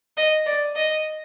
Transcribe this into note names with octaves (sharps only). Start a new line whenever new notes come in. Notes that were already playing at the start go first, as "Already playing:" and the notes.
D#5
D5
D#5